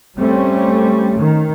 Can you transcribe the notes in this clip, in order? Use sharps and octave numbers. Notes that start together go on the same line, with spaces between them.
G3 A3 C4 C#4
D#3